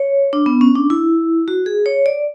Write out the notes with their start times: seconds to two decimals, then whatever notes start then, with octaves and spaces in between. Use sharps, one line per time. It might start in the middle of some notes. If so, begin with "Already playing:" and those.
Already playing: C#5
0.33 D4
0.46 B3
0.61 C#4
0.75 D4
0.90 E4
1.48 F#4
1.66 G#4
1.86 C#5
2.06 D5